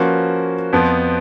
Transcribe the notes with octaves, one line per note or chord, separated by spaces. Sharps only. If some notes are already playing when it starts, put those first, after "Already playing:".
Already playing: F3 A#3 C#4 F#4 B4
F2 F3 B3